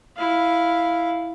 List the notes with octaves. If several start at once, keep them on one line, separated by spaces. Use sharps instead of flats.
E4 F5